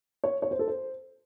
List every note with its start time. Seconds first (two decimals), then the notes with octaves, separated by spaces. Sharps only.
0.24 C#5
0.42 C#5
0.51 C5
0.59 A4
0.68 C5